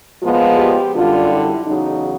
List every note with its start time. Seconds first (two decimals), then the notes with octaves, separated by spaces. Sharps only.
0.23 A#2 F3 G#3 B3 F4
0.58 G4
0.95 F#2 D3 G3 F4
1.30 E4
1.66 E2 C#3 F#3 D#4